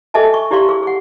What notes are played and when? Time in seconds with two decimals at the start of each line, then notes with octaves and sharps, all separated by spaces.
0.14 G#4 A4 D#5 E5 G#5 A5
0.34 C#6
0.51 E4 G4 D5 F5 C6 C#6
0.69 G#4
0.83 G#4 F#5